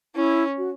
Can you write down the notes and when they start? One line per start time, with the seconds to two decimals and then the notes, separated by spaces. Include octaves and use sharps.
0.15 C#4 E4
0.58 F#4